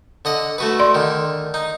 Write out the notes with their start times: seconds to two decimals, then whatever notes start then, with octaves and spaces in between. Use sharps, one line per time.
0.25 D3 D#5 F#5
0.58 A3 F#4 B4
0.79 D5 C6
0.95 D3 D#3
1.54 D#4